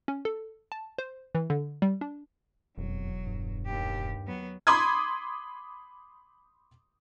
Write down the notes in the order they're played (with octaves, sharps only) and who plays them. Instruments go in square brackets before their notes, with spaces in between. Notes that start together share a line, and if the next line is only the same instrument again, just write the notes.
[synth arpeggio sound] C#4
A4
A5
C5
E3
D3
G3
D4
[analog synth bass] E1 [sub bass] F2 [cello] F#3
[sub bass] G2
[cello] D#2 G4
F#3 B3
[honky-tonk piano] B5 C6 D6 D#6 G#6